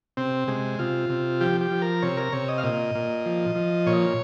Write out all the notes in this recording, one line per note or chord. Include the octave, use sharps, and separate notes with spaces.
C3 C4
C3 G#3
C3 F4
C3
F3 G4
G4
F3
A#4
C3 C#5
A#4
C3 C#5
D#5
F5
A#2 D#5
A#2
F3
F3
A#2 C#5